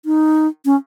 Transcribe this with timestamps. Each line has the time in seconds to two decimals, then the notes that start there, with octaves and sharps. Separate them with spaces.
0.05 D#4
0.65 C#4